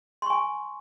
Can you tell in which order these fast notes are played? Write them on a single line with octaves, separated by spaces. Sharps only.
C6 C#6 G#5